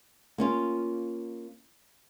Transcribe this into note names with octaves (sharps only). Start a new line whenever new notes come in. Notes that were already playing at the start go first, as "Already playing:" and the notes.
A#3 C#4 F4